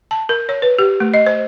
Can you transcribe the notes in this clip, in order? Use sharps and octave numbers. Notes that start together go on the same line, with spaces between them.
A5
A#4
C#5
B4
G4
A3
D#5
C5